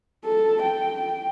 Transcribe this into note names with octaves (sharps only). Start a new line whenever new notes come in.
A4
G5